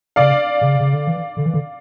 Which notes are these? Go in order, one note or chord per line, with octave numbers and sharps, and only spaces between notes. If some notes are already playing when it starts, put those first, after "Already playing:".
C#3 D5 F5
C#3
C#3
D3
E3
D3
E3
D3